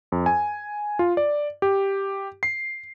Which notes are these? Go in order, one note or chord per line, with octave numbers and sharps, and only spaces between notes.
F2
G#5
F4
D5
G4
C7